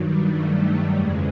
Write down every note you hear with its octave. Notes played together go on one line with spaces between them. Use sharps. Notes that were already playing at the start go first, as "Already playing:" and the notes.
Already playing: G2 D#3 F#3 G3
A3
A3
F2 C#3 E3 G#3